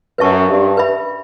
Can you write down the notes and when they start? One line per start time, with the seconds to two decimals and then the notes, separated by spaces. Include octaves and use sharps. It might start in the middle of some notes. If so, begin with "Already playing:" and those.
0.18 F#2 B4 E5 A5 C#6
0.48 G2
0.77 B4 E5 B5